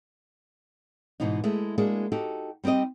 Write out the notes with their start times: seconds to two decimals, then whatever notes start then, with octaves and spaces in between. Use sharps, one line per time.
1.20 G#2 B2 E3 B3 D#4
1.44 G#3 A3 B3 E4
1.78 G#3 A#3 D4 E4 F#4 G#4
2.12 D#4 F#4 G4 A4
2.64 G3 C4 D#4 G4 D#5